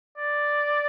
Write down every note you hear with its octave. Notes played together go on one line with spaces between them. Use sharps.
D5